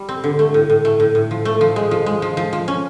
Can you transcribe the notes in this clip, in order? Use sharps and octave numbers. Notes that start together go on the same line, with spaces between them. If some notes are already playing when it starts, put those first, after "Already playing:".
Already playing: G3
C4
D3
A3
A2
A2
A3
A2
A2
F3
A3
F3
G#3
F3
G#3
F3
F3
F3
C#4